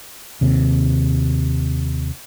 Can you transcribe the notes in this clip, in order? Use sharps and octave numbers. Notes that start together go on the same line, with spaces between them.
D#2 C3